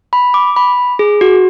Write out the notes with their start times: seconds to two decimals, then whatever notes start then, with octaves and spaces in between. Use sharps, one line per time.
0.13 B5
0.34 D6
0.56 B5
0.99 G#4
1.21 F#4